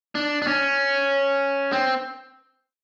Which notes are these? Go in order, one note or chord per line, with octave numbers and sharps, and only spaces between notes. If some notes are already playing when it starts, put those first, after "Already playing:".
D4
D4
C#4
C4